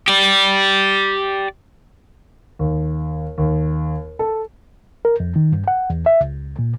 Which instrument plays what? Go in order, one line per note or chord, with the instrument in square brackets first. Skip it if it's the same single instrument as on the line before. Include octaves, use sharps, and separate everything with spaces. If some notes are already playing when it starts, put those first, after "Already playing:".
[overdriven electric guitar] G4 D5
[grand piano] D#2
D#2
A4
[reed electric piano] A#4
F2
D#3
G2
F#5
E2
E5
C#2
A#2